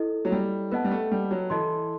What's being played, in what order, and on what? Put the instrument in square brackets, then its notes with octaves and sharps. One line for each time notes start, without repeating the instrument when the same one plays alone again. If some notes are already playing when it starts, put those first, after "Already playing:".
Already playing: [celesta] E4 A4 D#5
[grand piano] F#3
G3
[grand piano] B3 [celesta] B4 D#5 F#5 A5
[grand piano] G3
A3
G3
F#3
[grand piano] E3 [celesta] E4 A4 D#5 A5 C6